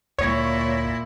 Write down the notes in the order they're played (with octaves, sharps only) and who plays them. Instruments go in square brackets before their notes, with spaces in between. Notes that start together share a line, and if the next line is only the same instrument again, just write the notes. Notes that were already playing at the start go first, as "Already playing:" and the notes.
[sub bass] D2 [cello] A#2 E4 [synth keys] C#5